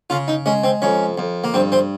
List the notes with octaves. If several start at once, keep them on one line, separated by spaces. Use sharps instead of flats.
C#3 F4
D#4
G#3 C#4
C4
F2 C#4
F2
A#3
G2 C4
C4